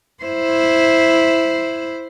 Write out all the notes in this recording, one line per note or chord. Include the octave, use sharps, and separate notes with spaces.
E4 C5